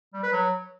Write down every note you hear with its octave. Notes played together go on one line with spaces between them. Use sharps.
G3
B4
F#3